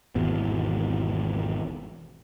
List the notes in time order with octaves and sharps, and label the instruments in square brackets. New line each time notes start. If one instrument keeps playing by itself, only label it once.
[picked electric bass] G#1 E2 B2